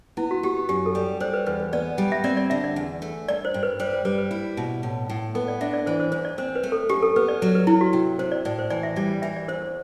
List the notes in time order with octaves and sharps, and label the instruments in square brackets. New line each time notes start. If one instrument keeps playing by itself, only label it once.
[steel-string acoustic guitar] B3 [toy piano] E4
[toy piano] F#4
[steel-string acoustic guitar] B3 [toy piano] G4
[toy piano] G4
[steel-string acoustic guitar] F#2 [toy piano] G4
[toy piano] A4
[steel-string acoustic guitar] G3
[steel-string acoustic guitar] G3 [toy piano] C5
[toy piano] B4
[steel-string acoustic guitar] E2 [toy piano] B4
[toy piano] B4
[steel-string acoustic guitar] B3 [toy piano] D5
[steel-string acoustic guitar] G3
[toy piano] E5
[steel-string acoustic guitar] C4 [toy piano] D5
[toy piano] D5
[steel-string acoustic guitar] D3 [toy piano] E5
[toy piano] D5
[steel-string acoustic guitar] E2
A3
[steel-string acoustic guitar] G2 [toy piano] D5
[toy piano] C5
[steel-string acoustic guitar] G2
[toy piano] B4
[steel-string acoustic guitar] G3 [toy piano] C5
[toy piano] C5
[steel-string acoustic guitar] G3 [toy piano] B4
[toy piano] B4
[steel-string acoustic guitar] E4
B2
A2
A2
[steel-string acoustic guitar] B3 [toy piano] A4
[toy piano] D5
[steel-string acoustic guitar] D4 [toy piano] E5
[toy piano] D5
[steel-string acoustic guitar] E3 [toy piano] C5
[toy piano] C5
[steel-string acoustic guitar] E2 [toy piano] C5
[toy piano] D5
[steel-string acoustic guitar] C4 [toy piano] C5
[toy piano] B4
[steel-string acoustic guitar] A3
[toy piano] A4
[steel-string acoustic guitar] F#2 [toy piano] G4
[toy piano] A4
[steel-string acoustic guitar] B3 [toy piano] B4
[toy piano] D5
[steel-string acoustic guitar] F#3
[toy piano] B4
[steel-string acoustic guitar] F#3 [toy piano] E4
[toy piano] F#4
[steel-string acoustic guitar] C3
[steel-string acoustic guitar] C3 [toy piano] C5
[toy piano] D5
[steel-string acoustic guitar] A2 [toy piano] D5
[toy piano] C5
[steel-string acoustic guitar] E3 [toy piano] D5
[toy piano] E5
[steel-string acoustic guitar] G3 [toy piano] D5
[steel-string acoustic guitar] E3 [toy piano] E5
[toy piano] D5
[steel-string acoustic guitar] E2 [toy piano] C5
[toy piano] C5